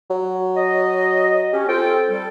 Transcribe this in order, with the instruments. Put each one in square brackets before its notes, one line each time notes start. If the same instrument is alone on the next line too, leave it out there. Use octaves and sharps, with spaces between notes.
[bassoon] F#3
[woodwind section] D#5
[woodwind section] C#4 [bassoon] G4
[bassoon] C4 [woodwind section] F4 A4 G5
[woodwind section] G3 A4